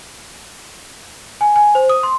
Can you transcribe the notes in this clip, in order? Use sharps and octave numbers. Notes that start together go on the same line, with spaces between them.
G#5
G#5
C5
D#6
C6